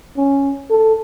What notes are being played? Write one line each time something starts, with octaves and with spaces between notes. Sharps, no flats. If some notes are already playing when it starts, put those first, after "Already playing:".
C#4
A4